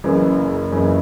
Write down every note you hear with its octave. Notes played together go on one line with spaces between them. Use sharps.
F#1 F#2 C#3 E3
F#1 F#2 C#3 E3